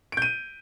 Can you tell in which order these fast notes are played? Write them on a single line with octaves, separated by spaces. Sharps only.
D7 G6 D#7